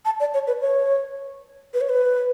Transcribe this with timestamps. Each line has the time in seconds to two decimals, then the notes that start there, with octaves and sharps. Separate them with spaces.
0.05 A5
0.20 D5
0.34 C#5
0.47 B4
0.61 C#5
1.74 B4
1.81 C#5
1.89 B4